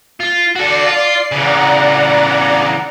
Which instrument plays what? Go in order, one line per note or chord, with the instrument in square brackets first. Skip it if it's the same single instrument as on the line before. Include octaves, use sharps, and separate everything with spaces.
[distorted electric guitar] F4
[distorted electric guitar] F#4 A4 [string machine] D5 C7
[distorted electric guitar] F4
[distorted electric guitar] C#3 E3 [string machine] D5 F#5 A#5